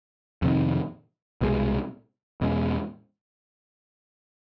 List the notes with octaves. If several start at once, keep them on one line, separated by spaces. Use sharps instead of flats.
F2 C3 D#3
C2 B2 G#3
E2 B2 G#3 C#4